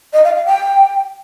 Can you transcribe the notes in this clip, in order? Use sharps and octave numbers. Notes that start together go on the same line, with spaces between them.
D#5
F5
F5
G5